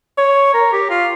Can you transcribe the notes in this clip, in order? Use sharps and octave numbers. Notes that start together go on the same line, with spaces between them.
C#5
A#4
G4
F4